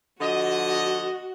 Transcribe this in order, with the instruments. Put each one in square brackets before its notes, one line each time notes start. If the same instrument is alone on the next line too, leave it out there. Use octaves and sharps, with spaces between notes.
[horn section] D3 F3 D#5 [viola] F#4